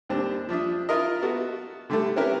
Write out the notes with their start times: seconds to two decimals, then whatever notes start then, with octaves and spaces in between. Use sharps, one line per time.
0.09 D#2 G3 C4 D4
0.49 F3 D4 E5 D#6
0.89 E4 F4 A#4 D#5
1.22 B3 F#4 A4
1.90 D3 G3 A3 E4 A4
2.16 C4 C#4 E4 G4 A#4 B4